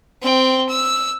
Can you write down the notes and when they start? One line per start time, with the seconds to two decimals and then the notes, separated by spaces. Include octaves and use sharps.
0.22 C4 G5
0.69 E6